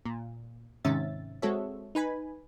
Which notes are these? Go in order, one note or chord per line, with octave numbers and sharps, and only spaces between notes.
A#2
G#2 C3 D#3 C#4 E5 A6
G#3 C4 F#4 A4 C#5 E5
D#4 B4 G#5 B5